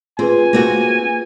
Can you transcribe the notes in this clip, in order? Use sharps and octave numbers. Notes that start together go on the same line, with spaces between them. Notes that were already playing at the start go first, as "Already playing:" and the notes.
C4 F4 G#4 B4 G#5
A#3 C4 F#4